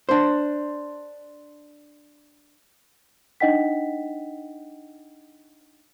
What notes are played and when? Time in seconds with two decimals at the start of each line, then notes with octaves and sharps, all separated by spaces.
0.09 D4 C5
3.40 D4 D#4 D#5 F#5 G5 B6